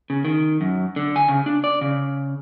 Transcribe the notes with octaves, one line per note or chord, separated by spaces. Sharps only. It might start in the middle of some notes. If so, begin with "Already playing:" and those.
C#3
D#3
F#2
D3
G#5
C#3
D4
D5
C#3